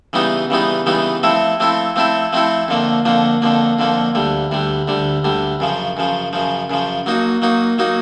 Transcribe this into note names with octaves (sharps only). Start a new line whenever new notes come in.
C#3 E3 G3 B3 D#4
C#3 E3 G3 B3 D#4
C#3 E3 G3 B3 D#4
F3 A3 C4 E4 A4
F3 A3 C4 E4 A4
F3 A3 C4 E4 A4
F3 A3 C4 E4 A4
F2 D3 F3 A#3
F2 D3 F3 A#3
F2 D3 F3 A#3
F2 D3 F3 A#3
D2 D3 G3
D2 D3 G3
D2 D3 G3
D2 D3 G3
F#2 C#3 F3
F#2 C#3 F3
F#2 C#3 F3
F#2 C#3 F3
F#3 A#3 D#4 F#4
F#3 A#3 D#4 F#4
F#3 A#3 D#4 F#4